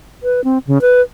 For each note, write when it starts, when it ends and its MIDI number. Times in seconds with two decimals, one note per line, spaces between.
0.23 0.41 71
0.44 0.58 60
0.67 0.81 49
0.81 1.01 71